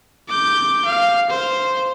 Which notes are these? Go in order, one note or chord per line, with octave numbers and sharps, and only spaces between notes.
D6 G6
F5
C5